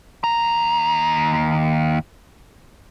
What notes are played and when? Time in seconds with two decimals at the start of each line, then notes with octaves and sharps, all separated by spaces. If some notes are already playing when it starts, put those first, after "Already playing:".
0.24 D#2 A#5